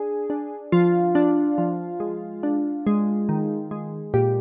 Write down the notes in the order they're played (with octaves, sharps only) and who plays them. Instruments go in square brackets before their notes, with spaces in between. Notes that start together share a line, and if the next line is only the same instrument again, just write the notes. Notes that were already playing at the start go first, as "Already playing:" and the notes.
Already playing: [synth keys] D4 G#4
D4
F3 F4
D4
F3
G#3
D4
G#3
D#3
G#3
A#2 G4